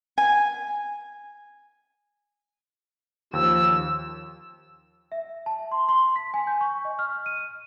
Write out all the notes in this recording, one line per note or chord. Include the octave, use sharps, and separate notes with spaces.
G#5
D#2 F3 E6
E5
A5
C6
C6
B6
G#5
G6
C#6
D#5
F6
D#7